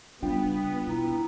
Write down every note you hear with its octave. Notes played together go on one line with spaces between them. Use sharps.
C#3 G3 B3 D4 F4 G5
B2 E4 A#5